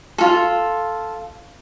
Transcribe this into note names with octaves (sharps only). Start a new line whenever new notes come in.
F4 A4